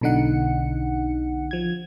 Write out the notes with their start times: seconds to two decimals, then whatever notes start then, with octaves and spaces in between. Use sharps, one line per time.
0.01 B1 B2 D3 D#4 F#5 C#7
1.51 F3 G#6